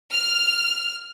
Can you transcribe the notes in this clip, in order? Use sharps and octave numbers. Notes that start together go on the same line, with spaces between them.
F6